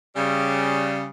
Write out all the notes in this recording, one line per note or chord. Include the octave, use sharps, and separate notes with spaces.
C#3 G3